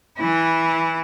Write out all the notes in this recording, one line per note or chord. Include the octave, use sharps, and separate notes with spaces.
E3 E4